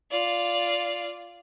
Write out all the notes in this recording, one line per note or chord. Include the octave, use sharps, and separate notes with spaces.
F4 D5